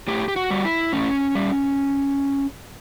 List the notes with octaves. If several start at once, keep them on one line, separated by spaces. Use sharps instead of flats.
A2 G4
G4
F#4
G3
E4
A2 C#4
G3